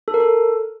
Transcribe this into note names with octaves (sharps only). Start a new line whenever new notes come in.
A4
A#4
A4